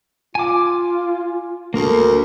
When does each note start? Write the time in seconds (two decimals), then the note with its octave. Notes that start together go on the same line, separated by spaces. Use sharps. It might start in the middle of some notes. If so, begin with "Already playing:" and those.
0.35 F4 G#5 D6
1.74 D2 A#3 A#4